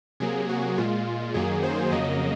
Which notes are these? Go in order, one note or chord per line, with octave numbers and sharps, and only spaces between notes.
C3 F#3 A#3 G#4
F#4
A#2 G#3 F4
F#2 D#3 F#3 A#3 G#4
C5
F2 C#3 F#3 A#3 D#5